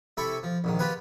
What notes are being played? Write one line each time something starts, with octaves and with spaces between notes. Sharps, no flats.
C3 E4 A4 B5 C#6
F3
A#1 G#2 D#3
F4 G4 G#4 B4 F#5 G#5